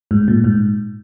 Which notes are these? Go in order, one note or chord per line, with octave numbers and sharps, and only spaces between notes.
G#2
A#2
G#2